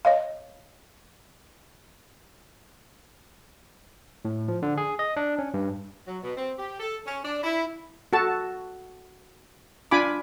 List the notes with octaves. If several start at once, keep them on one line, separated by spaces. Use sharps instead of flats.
C#5 D#5 F5
A2
F3
D3
G#4
D#5
D4
C#4
G2
F#3
B2
C4
G4
A4
C#4
D4
E4
F#4 A4 A5
D4 F4 G#5 B5 D6